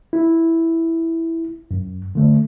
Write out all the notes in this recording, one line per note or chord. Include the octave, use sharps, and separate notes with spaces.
E4
F#2
D3 A3